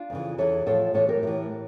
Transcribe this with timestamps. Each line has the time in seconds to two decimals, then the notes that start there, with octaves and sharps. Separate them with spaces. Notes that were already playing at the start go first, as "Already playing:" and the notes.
Already playing: D4 F4
0.10 F2 C#3 E3
0.38 E2 E3 A4 C#5
0.66 A2 F3 A4 C#5
0.94 A2 E3 A4 C#5
1.09 G4 A#4
1.23 A2 E3